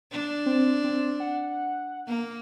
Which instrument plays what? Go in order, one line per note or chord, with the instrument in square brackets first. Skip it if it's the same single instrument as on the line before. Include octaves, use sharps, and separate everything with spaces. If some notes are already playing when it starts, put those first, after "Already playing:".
[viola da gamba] D4
[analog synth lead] C4
C4
F#5
[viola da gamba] A#3